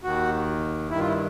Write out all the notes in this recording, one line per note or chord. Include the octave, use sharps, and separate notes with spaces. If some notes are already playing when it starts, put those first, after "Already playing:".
D#2 D#3 F#4
G2 D#3 E4
F4
E4